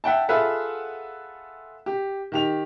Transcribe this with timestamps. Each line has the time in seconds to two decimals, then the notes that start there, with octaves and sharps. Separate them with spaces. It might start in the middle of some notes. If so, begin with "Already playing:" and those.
0.04 E5 F#5 G5 A5
0.29 F4 G#4 A4 B4 E5 F#5
1.86 G4
2.32 D#3 G4 F7